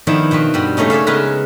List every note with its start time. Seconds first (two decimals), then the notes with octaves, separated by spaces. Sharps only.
0.07 D#3 F3 B3 D4 E4
0.31 B2 C4 F4 B4
0.54 G2 G3 F#4
0.77 C#3 A3 A#3 C#4 D#4
0.90 C#5 D5 E5 F5
1.07 C#3 G#3 B3 A#4 B4